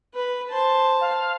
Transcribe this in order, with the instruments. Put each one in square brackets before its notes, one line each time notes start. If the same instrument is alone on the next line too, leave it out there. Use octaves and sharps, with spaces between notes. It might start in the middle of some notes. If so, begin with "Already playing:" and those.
[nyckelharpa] B4
C5 A5
[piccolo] F5